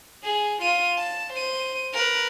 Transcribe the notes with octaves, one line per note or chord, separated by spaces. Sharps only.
G#4
F4 D#7
A5
C5 D#7
A#4 B4